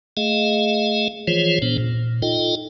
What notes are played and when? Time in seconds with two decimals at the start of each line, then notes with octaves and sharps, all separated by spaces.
0.17 A3 G#4 D#5 F5
1.27 E3 F3 F4 G#4 C5 C#5
1.62 A#2 B3 D4 C5
1.78 A#2
2.22 D#4 F4 A4 D#5 G5